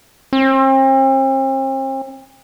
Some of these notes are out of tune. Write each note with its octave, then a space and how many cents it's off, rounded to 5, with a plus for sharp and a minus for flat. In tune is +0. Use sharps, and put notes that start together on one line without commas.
C4 +40